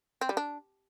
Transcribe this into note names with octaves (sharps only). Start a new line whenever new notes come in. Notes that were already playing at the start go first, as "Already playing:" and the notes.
C4
G3
D4